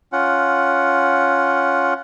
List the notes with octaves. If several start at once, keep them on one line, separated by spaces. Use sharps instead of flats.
C#4 F4 F#5